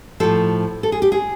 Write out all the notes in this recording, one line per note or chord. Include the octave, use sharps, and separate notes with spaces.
A2 F3 A4
A4
G#4
G4
G#4